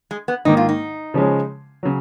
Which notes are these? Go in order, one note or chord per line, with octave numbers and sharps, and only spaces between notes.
G#3
B3
G#2 D#3 A#3 D#4
F4
D#4
C#3 F3 G#3 C#4
C#3 F#3